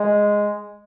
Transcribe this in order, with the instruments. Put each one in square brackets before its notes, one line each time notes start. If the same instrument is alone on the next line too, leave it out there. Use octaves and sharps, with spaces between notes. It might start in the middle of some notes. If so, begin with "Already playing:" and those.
Already playing: [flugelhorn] G#3